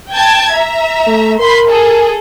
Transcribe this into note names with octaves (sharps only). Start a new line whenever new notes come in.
G5 A5 G#6
E5 A#5
A3
A#4 B5 C6
G#4 A4